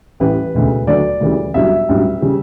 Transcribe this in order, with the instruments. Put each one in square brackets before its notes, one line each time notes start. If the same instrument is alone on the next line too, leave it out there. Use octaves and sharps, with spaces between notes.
[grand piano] A1 A2 E3 G3 B4
E1 D2 C#3
D2 D3 F#3 D5
D2 C#3 E3 G3
G1 G2 F#3 E5
A1 G2 F#3
C#3 G3